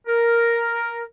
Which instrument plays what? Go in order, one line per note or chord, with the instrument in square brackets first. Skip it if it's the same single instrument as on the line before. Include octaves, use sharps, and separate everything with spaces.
[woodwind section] A#4